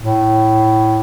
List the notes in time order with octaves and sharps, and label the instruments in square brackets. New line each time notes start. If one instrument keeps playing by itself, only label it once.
[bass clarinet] A2